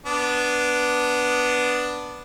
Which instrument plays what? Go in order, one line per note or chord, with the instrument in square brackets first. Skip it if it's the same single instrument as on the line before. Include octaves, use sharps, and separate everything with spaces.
[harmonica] B3 D4